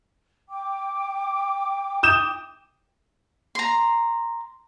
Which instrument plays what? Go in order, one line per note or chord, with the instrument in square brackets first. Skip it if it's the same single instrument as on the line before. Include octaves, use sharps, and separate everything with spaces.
[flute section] G5 D6
[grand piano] D#6 G6 E7
[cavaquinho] A#5 C6